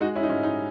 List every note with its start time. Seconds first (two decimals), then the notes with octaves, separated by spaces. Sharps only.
0.01 G#3 D#4 F#4
0.16 C#4 E4
0.23 D#4
0.29 G#2 C#4
0.43 D#4